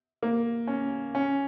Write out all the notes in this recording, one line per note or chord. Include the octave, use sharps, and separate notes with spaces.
A#3
C#4
C#4